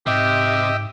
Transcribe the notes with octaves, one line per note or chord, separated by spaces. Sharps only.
G#2 C3 G4 D#5 E5